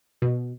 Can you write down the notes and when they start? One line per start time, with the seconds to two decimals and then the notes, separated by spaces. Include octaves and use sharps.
0.22 B2